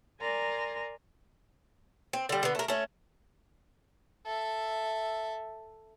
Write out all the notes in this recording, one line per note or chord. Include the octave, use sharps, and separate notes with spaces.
A#4 D5 G#5 A#5 C6
C4
D3 G3
D3 B3
A3 A#4
A3 C#4
A4 E5